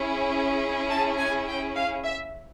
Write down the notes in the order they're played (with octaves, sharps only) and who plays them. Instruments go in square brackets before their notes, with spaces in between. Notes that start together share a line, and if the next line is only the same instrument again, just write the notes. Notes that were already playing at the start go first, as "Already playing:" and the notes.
Already playing: [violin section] C#4 E4 G#4
A5
G#5
G5
F5
E5